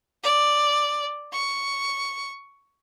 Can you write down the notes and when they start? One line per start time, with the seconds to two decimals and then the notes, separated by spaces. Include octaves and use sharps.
0.23 D5
1.33 C#6